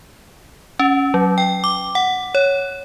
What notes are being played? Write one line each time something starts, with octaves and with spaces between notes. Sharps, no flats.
C#4
F#3
G5
D6
F#5
C#5